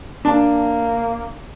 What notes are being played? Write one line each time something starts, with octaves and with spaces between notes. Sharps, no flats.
A#3 D4 A5